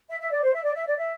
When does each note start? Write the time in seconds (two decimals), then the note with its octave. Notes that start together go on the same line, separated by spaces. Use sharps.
0.09 E5
0.20 E5
0.30 D5
0.42 C5
0.53 E5
0.63 D5
0.75 E5
0.86 D5
0.97 E5